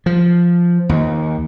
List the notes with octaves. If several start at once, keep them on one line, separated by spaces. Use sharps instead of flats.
F3
D#2